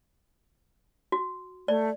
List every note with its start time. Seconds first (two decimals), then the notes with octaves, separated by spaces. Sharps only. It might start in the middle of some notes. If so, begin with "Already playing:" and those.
1.12 F#4
1.68 A3 D5